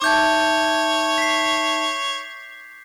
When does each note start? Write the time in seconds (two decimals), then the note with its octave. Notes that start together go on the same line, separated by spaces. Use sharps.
0.02 D#4 C#5 E5 A5 D6 G6 G#6
1.18 B6 C7